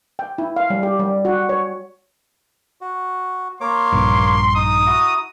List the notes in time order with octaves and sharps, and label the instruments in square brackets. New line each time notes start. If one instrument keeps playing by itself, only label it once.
[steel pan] G5
E4
F5
G3
G4
G3
F#4
C#5
[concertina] F#4
[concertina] A#3 C#5 D6 [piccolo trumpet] C6
[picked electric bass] A#1 G2
[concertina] D#4 [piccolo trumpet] D#6
[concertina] E4 F#4 A#5